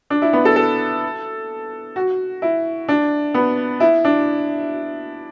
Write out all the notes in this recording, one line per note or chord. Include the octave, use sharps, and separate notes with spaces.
D4
E4
B3
A4
A4
F#4
E4
D4
B3
E4
D4